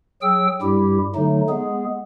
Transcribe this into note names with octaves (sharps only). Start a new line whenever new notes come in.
F#3 G#4 G5 E6
G2 G3 E4 G4
D3 F#3 A3 D#4
G#3 B3 G#4